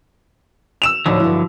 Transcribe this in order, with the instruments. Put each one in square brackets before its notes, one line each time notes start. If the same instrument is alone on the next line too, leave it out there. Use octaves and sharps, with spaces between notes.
[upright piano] E6 E7 F7
[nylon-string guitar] D2 A2 D#4 [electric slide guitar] D3 F3 F#3
[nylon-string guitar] G2 E4